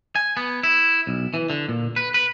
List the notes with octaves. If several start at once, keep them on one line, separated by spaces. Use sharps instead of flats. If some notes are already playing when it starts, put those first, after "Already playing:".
G#5
B3
E4
B1
E3
D3
A#2
B4
B4